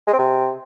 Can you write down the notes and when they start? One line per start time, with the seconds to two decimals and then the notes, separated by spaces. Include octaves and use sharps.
0.07 G#3
0.13 C4
0.19 C3